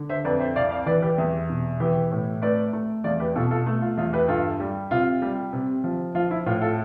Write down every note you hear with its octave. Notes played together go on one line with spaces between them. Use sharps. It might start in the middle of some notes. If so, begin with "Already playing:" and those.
Already playing: D3
C5 E5
F2 B4 D5
C5 E5
C2 D5 F5
D5 F5
E3 B4 D5
G4 B4
E2
B2
E3 G4 B4
A2
A3 B4 D5
A3
E2 D5 F5
G4 B4
B2 F4 A4
F4 A4
A3
F4
E2 F4
G4 B4
G2 F4 A4
G3
C3 F4
G3
C3
F3
F3 F4
E4
A2 F4
F4 A4